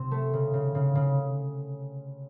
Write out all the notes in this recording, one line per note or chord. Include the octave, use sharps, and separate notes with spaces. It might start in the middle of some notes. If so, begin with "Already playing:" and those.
Already playing: C3 C4
A3
C#3
C#3
C#3
C#3